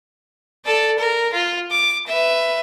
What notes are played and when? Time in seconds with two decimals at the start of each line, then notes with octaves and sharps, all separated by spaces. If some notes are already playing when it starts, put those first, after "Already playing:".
0.66 A4 D5
0.98 A#4
1.33 F4
1.71 D6
2.07 B4 E5